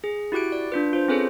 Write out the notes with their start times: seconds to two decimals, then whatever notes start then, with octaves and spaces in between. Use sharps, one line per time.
0.04 G#4
0.32 E4 F#4 G4 F#6 D7
0.52 D5
0.72 D4 F4 B4
0.93 F4 C5
1.08 C4 C#4 G#4 A4 B4 C#5